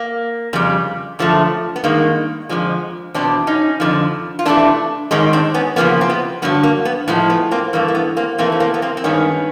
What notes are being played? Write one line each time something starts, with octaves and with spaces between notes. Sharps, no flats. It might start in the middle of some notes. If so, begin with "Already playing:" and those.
Already playing: A#3
F2 C#3 G3
F#2 D3 F3 A3
B3
G2 D#3 G#3 A#3
F2 D3 F3 G#3
E2 B2 F#3 C4 D4
C#4 D#4
F2 D3 F3
F4
C3 E3 A3 D4 E4
G#2 D#3 G#3 C#4 D#4
C4 D4
B3 C#4
E2 C#3 F3 A#3 B3
C4
B3
G2 D3 F#3 B3
A#3
B3
A2 F3 G#3 A#3
B3
A#3 C4
G2 E3 A3 A#3
A#3
B3
A#3 C4
C3 E3 A3 A#3 C4
C#4
A#3 C4
B3
A#3 C4
C4
G2 D#3 G#3 B3 C#4